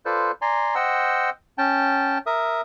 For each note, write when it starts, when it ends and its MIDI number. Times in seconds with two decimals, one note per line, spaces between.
0.05 0.31 65
0.05 0.31 69
0.05 0.31 71
0.05 0.31 72
0.05 0.31 74
0.42 0.75 74
0.42 0.75 80
0.42 0.75 82
0.42 0.75 84
0.75 1.30 72
0.75 1.30 75
0.75 1.30 78
0.75 1.30 79
0.75 1.30 88
1.58 2.18 61
1.58 2.18 79
1.58 2.18 81
2.26 2.61 70
2.26 2.61 76
2.26 2.61 87